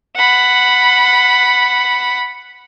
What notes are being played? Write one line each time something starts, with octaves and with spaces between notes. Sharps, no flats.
F#5 B5